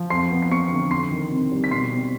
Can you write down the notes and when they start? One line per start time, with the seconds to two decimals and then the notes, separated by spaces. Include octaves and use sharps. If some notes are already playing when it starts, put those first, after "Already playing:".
Already playing: F3
0.10 F2 C6 C7
0.31 B3
0.42 C7
0.50 B3 C#6 C#7
0.71 D3
0.91 F2 C6 C7
1.11 D#3
1.31 C3
1.52 G3
1.64 B6
1.71 B2 C6 C7
1.92 C4